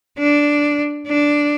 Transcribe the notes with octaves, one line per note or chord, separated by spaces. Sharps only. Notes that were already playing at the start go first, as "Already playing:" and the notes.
D4
D4